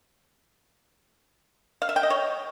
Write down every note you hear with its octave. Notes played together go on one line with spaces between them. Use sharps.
F5
E5
G5
D#5
C#5